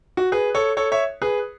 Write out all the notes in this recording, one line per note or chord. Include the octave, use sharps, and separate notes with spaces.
F#4
G#4 B4
A4 C#5
A4 C#5
C#5 E5
G#4 B4